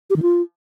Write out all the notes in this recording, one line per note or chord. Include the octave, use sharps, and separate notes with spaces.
G4
D#3
F4